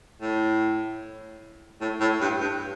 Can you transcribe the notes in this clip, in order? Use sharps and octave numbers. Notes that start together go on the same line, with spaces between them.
A2
A2
A2
G2
G2